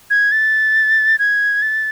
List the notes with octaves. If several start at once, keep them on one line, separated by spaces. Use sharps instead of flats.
G#6
A6
G#6
A6